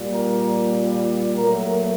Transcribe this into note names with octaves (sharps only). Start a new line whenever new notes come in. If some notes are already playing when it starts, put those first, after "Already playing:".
Already playing: A#2 G3
A#4
A#2 F#3 A3 A#4